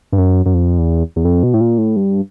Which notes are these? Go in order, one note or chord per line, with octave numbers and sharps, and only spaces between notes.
G2
F#2
F#2
F2
E2
E2
F2
B2
A2
A#2
A2
G2